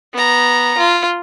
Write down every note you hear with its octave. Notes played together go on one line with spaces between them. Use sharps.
B3 A#5
F4